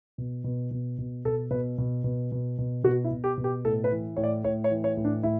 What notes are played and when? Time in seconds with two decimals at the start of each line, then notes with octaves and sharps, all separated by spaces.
0.18 B2
0.44 B2
0.71 B2
0.98 B2
1.25 B2 A4
1.51 B2 B4
1.78 B2
2.04 B2
2.32 B2
2.58 B2
2.84 B2 F#4
3.04 E4
3.11 B2
3.24 G4
3.38 B2
3.44 G4
3.65 A2 A4
3.84 B4
3.91 E3
4.17 A2 C#5
4.24 D5
4.44 A2 C#5
4.64 C#5
4.71 E3
4.84 C#5
4.97 A2
5.04 D4
5.23 A2 E4